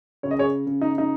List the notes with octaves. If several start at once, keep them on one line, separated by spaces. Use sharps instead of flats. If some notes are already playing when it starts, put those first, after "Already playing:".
C#3 C#5
D#5
G#4 C#5
C#3
D#4
D#4